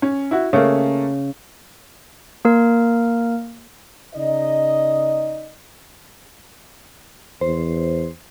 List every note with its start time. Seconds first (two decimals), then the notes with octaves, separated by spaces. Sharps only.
0.02 C#4
0.31 E4 F#4
0.53 C#3 A3 A#3
2.45 A#3 A#4
4.15 C#3 D#4 D5 D#5
7.41 E2 C5